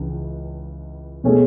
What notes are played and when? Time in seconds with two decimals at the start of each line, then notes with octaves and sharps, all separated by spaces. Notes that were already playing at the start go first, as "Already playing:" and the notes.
Already playing: C#2 C#3 E3
1.24 B2 A3 C#4 G#4